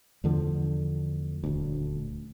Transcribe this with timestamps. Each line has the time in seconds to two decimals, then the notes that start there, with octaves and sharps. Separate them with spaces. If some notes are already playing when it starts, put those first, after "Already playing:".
0.24 E2 D3 F3 A3
1.44 D#1 D2